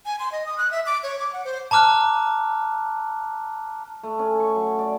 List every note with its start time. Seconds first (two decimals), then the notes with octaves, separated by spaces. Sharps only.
0.06 G#5
0.19 C6
0.32 D#5
0.46 D#6
0.58 F#6
0.71 E5
0.86 D6
1.03 C#5
1.19 D6
1.33 F#5
1.45 C5
1.71 A5 A#5 D6 F6 F#6
4.03 A3
4.19 C#4
4.40 C#6
4.56 F#3
4.79 D5